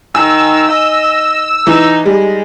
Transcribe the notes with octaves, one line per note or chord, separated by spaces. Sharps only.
D#3 G#5 E6
D#5
E3 D#4
G3 G#3